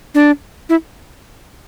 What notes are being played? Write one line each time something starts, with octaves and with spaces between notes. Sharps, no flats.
D4
E4